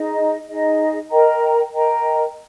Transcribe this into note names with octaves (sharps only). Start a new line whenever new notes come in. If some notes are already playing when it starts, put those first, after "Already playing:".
Already playing: D#4 G#4 D#5
D#4 G#4 D#5
A#4 D#5 G5 A#5
A#4 D#5 G5 A#5